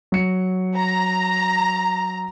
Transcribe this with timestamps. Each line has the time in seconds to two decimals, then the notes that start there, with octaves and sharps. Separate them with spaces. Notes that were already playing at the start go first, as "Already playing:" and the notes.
0.12 F#3 C#7
0.78 A#5